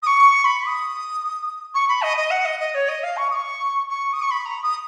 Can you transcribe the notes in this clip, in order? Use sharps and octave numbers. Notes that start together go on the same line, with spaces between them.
D#6
C#6
B5
D#6
C#6
B5
D#5
D#5
F#5
D#5
D#5
C#5
D#5
F5
C#6
D#6
C#6
C#6
D#6
C#6
B5
A#5
D#6